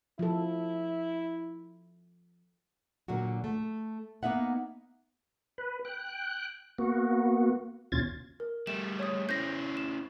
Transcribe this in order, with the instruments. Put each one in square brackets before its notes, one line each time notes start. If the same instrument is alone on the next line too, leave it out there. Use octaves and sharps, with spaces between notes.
[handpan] F3 A4 [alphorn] E4
[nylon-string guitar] A#2 D3 F#3 F#4
A3
A#3 B3 D#4 E5 F#5
[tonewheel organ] B4
G5 F#6
A#3 B3 F#4
D#2 B2 C#4 F4 G#6 A6
[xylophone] A#4
[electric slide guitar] G3 A3 [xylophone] E7
[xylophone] C#5 D#6
[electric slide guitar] C#4 E4 C5 [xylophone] G6 A#6
[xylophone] E7